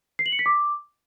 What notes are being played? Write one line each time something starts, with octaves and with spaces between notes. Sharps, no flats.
C7
F#7
C#7
B6
D6